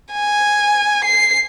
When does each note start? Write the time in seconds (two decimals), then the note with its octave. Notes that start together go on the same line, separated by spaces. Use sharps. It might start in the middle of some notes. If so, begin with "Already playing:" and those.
0.12 G#5
1.05 C7